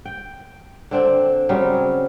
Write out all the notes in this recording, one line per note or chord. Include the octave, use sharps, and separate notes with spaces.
G5
D3 C4 D4
C#3 F#3 G3 C4